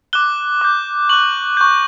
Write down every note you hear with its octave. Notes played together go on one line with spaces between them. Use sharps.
D6 F#6 G7
D6 G6
C#6 F#6 F#7
C#6 G6